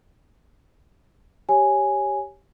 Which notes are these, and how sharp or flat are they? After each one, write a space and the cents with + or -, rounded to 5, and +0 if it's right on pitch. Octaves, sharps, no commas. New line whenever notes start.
G4 +0 C#5 +0 G#5 +0